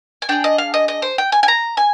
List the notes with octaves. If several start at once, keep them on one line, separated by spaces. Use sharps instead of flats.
G#5
D4 G#4 G5
D#5
F5
D#5
D#5
C5
G5
G#5
G#5
A#5
G#5